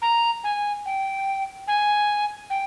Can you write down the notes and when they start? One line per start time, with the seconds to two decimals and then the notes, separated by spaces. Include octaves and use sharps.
0.02 A#5
0.44 G#5
0.86 G5
1.67 G#5
2.50 G5